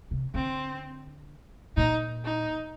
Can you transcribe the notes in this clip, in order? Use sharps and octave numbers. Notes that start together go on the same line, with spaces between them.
C3
D3 C4
A#2 D#4
D#4